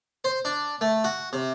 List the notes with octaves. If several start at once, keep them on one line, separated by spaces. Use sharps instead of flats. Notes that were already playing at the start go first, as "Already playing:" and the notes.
C5
D4
A3
F#4
C3